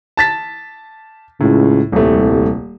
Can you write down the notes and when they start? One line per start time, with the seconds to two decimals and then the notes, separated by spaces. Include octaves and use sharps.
0.17 A5 A6 B6
1.41 C#2 A2
1.92 D#1 C2 A3